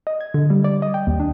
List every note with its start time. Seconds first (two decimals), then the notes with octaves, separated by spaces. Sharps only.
0.07 D#5
0.21 G#6
0.34 D3
0.50 G3
0.64 D5
0.82 D#5
0.94 G5
1.07 D#2
1.20 D4